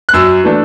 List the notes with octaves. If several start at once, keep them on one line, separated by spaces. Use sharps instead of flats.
F#6
F#2 E6
E3 A3 D4